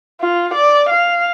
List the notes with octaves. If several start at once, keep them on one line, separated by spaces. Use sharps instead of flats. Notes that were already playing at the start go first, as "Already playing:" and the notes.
F4
D5
F5